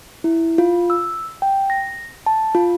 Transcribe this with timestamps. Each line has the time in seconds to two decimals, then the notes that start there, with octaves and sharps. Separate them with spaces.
0.24 E4
0.58 F4
0.90 E6
1.42 G5
1.70 A#6
2.26 A5
2.55 F4